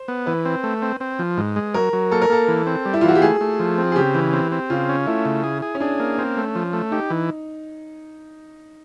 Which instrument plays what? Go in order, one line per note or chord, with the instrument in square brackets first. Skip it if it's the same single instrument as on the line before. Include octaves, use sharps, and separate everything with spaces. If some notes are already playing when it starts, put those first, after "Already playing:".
Already playing: [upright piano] C5
[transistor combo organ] B3
[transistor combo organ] E3 [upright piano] B4
[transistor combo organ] C4
A3
C4
C4
F3
G#2
G#3
[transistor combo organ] F#3 [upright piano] A#4
[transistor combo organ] F#3
[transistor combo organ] A#3 [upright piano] A4
[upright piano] A#4
[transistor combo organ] A#3 [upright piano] A4
[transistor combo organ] E3
C4
G3
[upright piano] E4
F4
[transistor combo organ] E3 [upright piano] F#4
[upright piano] G4
[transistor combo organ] A3 [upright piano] G#4
[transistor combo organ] A3
F3
C4
[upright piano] G#4
[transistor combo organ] C#3 [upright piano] G4
[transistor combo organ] E3
C4
C4
[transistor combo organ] C#3 [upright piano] F4
[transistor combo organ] C#4
[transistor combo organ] A3 [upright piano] E4
[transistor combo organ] C#3
G#4
G#4
[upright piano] C#4
[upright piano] D4 [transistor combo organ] G#4
[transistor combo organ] A#3
[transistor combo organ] C4 [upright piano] C#4
[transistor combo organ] A3
F3
A3
[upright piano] D#4 [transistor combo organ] G4
[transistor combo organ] E3